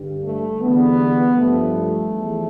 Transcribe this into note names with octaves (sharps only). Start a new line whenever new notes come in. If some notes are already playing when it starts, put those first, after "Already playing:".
Already playing: G2 D3 G3
A3
E2 D3 G3 B3
G2 F3 A3
E2 C3 F3